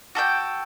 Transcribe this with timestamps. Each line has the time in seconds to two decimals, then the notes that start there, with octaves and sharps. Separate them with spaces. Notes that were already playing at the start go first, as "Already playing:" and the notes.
0.15 F#4 A4 E5 G5